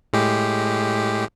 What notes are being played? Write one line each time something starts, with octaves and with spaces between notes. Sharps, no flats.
A2 G#3 G4